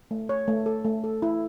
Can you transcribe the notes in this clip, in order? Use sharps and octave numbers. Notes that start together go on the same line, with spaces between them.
A3
C#5
A3
A4
A3
A4
E4